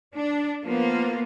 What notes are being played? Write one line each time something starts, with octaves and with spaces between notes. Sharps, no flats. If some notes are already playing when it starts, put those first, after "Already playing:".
D4
F3 A#3 B3 F4